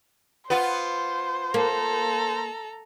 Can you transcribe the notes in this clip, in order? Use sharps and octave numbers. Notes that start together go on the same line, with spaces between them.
B3 F4 C5
A#3 A4 A#5